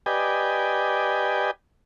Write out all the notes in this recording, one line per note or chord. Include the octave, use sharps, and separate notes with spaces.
G4 B4 D5 D#5 G5 G#5